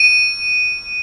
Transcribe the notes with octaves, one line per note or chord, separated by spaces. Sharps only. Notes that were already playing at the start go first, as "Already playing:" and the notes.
Already playing: D#7